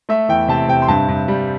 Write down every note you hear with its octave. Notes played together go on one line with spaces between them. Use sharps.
A3 E5
E2 G5
C3 A5
C3 G5
C6
G2 A5
G2
G3